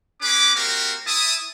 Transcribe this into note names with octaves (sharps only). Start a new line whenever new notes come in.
C#4 G#4 B4 D6
A#3 C4 F#4 G4 A#4
E4 E5 A5 D#6